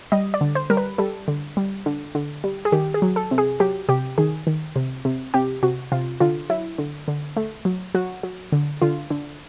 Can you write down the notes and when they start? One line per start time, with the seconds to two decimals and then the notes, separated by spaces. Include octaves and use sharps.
0.12 G3 D#5
0.34 D5
0.41 D3
0.55 C5
0.70 G3 A#4
0.77 B4
0.98 G3 A4
1.28 D3
1.57 G3
1.86 D3
2.15 D3
2.44 G3
2.65 G#4
2.72 D#3 G4
2.94 G#4
3.02 F#3
3.16 A4
3.31 C3
3.38 G#4
3.60 F#3 G4
3.89 C3 G4
4.18 D#3 G#4
4.47 D#3
4.76 C3
5.05 C3
5.34 C3 G4
5.63 C3 F#4
5.92 C3 F4
6.20 D3 F4
6.50 F#3 E4
6.78 D3
7.08 D3
7.36 A3
7.65 F#3
7.95 F#3 F#4
8.23 F#3
8.52 D3
8.82 D3 F4
9.10 D3